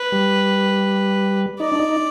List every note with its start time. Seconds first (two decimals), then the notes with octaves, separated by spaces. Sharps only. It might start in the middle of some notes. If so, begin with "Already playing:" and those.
Already playing: B4
0.12 G3
1.60 D#4 D5
1.72 D4
1.80 D#4